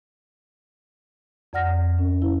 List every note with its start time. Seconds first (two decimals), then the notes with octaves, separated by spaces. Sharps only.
1.53 F2 D5 F#5 F6 A#6
1.98 C#4
2.22 E4